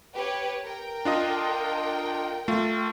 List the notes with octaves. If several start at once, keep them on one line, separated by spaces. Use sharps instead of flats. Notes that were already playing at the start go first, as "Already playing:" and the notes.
G4 B4 C#5
A#4 G5
D4 F4 D#5
A3 F4